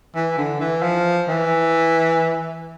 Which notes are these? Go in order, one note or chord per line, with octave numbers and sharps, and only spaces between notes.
E3
D3
E3
F3
E3